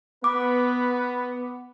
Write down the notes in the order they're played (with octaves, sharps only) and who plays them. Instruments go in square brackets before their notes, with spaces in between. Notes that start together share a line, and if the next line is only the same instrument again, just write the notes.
[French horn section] B3 [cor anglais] B4 [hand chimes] D6